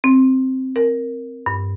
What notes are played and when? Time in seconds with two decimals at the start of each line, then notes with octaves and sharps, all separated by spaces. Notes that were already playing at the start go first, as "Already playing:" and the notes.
0.04 C4
0.76 A#4
1.46 G2